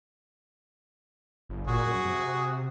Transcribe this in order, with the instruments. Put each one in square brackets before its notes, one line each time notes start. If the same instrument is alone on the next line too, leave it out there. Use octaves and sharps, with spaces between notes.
[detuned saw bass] G1
[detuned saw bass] A#2 [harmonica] F#4 G#4
[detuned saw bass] F#2
C3